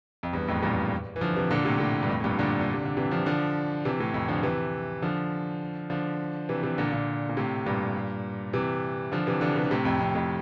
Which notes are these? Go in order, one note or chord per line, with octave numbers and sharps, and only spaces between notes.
F2
E2 G2
F2 A2
G2 A#2
E3
D3 F3
C3 E3
A#2 D3
A2 C3
A2 C3
G2
F2 A2
A2
G2 A#2
A#2 D3
A#2
C3
D3
C3 E3
D3 F3
D3 F3
C3 E3
A2 C3
F2 A2
D3 F3
C3 E3
D3 F3
D3 F3
C3 E3
C3 E3
A#2 D3
A#2 D3
A#2
A2 C3
G2 A#2
C3 E3
D3 F3
C3 E3
D3 F3
C3 E3
D3
A2 C3
F2 A2
F2
F2 A2